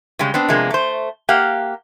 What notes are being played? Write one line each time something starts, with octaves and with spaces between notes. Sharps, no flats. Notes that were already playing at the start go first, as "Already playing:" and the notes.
C#3 G3 G#3
B3 C4 D4
C3 F3 G#3 A#3 B3
A3 C5
A#3 G4 F5 F#5